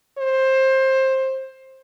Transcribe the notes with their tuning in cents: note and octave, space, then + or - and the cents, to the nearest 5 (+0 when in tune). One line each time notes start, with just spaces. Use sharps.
C5 +20